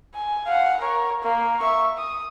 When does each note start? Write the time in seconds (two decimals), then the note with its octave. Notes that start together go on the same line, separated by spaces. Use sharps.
0.14 G#5
0.46 F5 F#5
0.81 A#4 C#5
1.22 A#3
1.59 E5 C#6
1.98 D#6